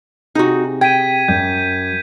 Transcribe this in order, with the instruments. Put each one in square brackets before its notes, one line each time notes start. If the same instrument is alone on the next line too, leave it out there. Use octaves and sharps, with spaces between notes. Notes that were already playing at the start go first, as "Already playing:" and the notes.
[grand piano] C3 G#4 [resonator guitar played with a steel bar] D#4 F#4
[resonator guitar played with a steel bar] G5 [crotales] G#6 B6 D#7
[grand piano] F#2 [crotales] G6